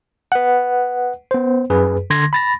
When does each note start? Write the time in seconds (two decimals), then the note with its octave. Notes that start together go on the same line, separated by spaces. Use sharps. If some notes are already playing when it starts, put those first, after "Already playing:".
0.32 B4 F#5
1.31 B3 C5
1.70 F#2 G#4 B4
2.10 D3 C6 G#6 A#6
2.33 B5 A6 A#6